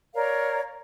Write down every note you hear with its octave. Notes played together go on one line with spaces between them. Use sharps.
A#4 C#5 D5 F5